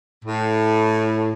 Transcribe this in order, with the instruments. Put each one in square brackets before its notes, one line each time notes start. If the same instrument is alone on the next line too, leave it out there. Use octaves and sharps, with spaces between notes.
[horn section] A2